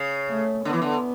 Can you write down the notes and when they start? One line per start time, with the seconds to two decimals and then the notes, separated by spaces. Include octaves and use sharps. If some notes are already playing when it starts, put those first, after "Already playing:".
Already playing: C#3
0.29 A3
0.65 D3 B3
0.73 E3
0.82 D3